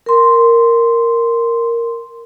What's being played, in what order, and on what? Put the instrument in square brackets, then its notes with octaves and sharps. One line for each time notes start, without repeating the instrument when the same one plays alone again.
[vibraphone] A#4 C6